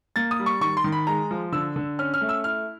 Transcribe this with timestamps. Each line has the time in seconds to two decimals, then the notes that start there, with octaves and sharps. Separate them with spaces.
0.16 A#3 A6
0.31 D#6
0.39 G3
0.46 C#6
0.61 D#3 C#6
0.77 C6
0.84 D#3
0.92 B5
1.07 G#3 A#5
1.31 F3
1.52 D3 E6
1.76 D3
1.99 C#4 F6
2.14 F6
2.21 A3
2.29 E6
2.44 E4 F6